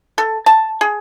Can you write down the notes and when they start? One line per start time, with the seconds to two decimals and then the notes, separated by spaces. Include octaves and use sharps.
0.18 A4
0.46 A5
0.81 G#4